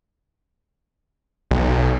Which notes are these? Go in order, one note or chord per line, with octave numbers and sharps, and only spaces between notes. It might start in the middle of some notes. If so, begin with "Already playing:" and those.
B1